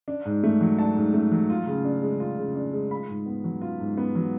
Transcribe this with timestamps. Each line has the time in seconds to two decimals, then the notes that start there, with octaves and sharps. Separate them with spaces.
0.08 D4
0.25 G#2
0.43 A3
0.61 F#3
0.79 D4 A5
0.96 G#2
1.14 A3
1.31 F#3
1.50 F4
1.67 C#3
1.85 D4
2.03 G#3
2.20 F4
2.38 C#3
2.56 D4
2.73 G#3
2.91 F4 B5
3.09 G#2
3.26 B3
3.44 F#3
3.62 F4
3.80 G#2
3.97 B3
4.15 F#3